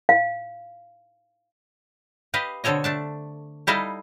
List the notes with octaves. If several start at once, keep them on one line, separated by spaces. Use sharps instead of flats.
F5
G4 B4 D#5 F5
B2 D3 C4 A4 C#5 D#5
A3 D4 A5
G3 D#4 E4 A4 D#5 F5